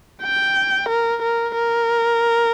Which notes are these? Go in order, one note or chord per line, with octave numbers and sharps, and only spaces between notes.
G5
A#4
A#4
A#4